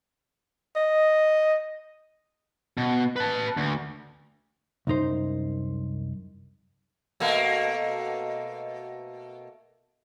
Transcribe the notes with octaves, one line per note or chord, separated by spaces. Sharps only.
D#5
B2
B4 A5
D2
C2 F#2 D#4 C5
B2 A3 A#3